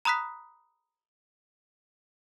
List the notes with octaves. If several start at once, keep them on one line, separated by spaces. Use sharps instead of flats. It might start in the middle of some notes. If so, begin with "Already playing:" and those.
A#5 B5 D#6 F#6 B6